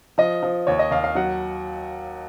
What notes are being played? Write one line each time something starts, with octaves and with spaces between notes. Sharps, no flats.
F3 D#5
F3
D#2 C#5
D#5
D#2 F5
F5
F#3 F#5